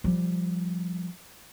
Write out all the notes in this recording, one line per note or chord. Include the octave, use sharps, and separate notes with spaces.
F3 G3